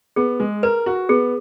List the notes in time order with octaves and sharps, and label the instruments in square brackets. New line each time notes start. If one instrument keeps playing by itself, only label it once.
[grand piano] B3 [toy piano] G#4
[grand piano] G#3
[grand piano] A#4 [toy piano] B4
[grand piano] F#4
[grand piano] B3 [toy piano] G#4